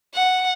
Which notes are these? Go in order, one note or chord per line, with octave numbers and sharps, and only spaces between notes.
F#5